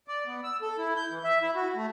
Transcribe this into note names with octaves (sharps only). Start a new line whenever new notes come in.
D5
B3
E6
A4
E4
G6
E3
E5
E4
F#4
A3